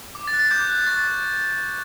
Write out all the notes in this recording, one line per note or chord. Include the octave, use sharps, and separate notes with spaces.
D6
A6
F#6
A6
D6 G6
F#6
C#6 A6